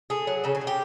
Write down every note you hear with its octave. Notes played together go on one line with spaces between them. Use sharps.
A3 G#4
F#3
C#3 A4
G#4
C#3
G4